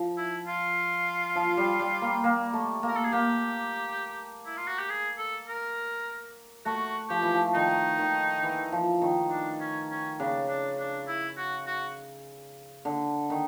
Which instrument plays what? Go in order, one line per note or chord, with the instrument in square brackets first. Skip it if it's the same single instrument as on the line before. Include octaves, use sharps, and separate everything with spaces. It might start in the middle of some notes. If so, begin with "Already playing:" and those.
Already playing: [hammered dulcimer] F3
[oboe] E4
F4
[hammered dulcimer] F3
G3
G3
A#3
A#3
A3
A#3
[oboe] A#4
A4
G#4
[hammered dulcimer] A#3 [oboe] G4
[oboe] E4
F4
F#4
G4
G#4
A4
A#4
[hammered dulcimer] A3 [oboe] F#4
[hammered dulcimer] F3 [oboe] G4
[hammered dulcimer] E3
F3
[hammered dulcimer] D#3 [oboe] D#4
[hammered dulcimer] D#3
E3
F3
D#3
[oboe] D4
C#4
C#4
[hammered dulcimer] C#3 [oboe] D4
[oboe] D4
D4
E4
F#4
F#4
[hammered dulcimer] D3
D#3